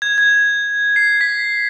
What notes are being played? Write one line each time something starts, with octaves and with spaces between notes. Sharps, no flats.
G#6
G#6
C7
B6